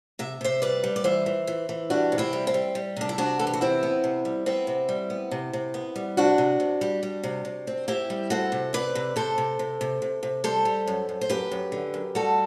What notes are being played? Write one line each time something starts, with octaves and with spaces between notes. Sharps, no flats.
C3 E5
C3 C5 E5
G3 B4 D5
G3
D5
E3 C5 E5
E3
E3
E3
G3 D4 F#4
C3
C4 E4
G3
C4
G3
G3
C3 D4
E4
C3 D4 F#4
E3 A4
G4
F#4
C3 C4 E4
B3
C3
G3
B3 C4 E4
C3
G3
B3
C3
C3
B3
G3
C3 D4 F#4
C3
C3
G3
G3
C3
C3
C4
C4 E4 G4
G3
C4 F#4 A4
C3
C4 B4 D5
C3
C3 A4 C5
C3
C3
C3
C3
C3
G3 A4 C5
G3
F#2
F#2
C5
F#2 G4 B4
F#2
D3
F#2
G3 F#4 A4